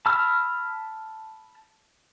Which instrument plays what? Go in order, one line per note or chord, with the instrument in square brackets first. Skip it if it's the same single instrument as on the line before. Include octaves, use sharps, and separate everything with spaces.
[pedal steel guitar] A5 B5 E6 F6